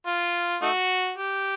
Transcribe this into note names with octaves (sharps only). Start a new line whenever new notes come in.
F4
A3 D#4 F#4
G4